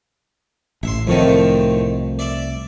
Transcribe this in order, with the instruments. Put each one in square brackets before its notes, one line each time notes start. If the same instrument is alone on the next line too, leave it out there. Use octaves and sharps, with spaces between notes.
[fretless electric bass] A1 [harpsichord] E5 C6
[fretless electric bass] C2 F3 A3 [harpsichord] F2 A2 D#3
[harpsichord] D5 E5